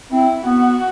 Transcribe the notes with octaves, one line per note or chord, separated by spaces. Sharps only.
C4 E4
B3 F#4